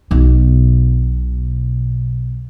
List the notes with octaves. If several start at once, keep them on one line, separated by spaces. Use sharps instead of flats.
B1 B2